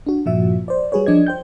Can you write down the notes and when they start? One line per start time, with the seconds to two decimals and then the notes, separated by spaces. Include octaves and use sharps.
0.07 D4 F#4
0.26 G2 A#2 F3 F#4 E5
0.68 C5 D5
0.92 G3 F#4 G#4 B4 C#5
1.06 F3 D4 D5 D#5 G#6
1.27 C5 G5 G6